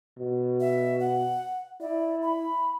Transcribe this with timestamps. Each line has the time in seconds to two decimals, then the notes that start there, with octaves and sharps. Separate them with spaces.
0.19 B2
0.60 E5
1.00 F#5
1.80 E4 D5
2.22 B5